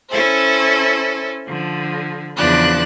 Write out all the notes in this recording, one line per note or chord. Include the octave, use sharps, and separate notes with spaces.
C#4 E4 A4 C5
D3 F3
E2 C#3 F3 D4 F#6